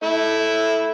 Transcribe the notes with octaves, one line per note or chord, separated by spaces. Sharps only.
A3 E4